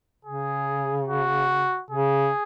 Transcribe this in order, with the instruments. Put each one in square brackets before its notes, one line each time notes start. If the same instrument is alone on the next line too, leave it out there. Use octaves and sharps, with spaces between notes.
[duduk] C#3 [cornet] G#4
[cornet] F#4
[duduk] C#3 [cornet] G#4